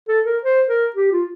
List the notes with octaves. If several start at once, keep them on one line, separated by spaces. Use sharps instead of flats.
A4
A#4
C5
A#4
G4
F4